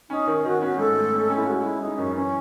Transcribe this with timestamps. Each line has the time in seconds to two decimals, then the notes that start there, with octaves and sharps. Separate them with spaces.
0.10 C#4 D#4
0.27 D#3
0.44 D#3 F#4
0.62 C#4 F#4
0.78 G#2 A4
0.95 A3
1.13 C#4
1.30 C#4
1.36 E4
1.47 G#3 F#4
1.64 G#3 E4
1.81 G#3 D#4
1.98 F#2 C#4
2.15 E3 C#4